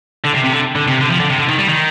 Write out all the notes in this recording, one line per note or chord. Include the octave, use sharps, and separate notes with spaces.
D3
C3
C3
D3
D3
C3
D3
F3
D3
C3
D3
D#3
G3
D#3